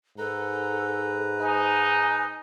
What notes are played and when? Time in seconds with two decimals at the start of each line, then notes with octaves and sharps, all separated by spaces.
0.18 G#2 A4 B4 A#5
1.40 D#4 G#5